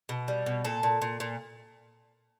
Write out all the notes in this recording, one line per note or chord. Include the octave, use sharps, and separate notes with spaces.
B2
G3
B2
A#2 A4
A#2
A#2
A#2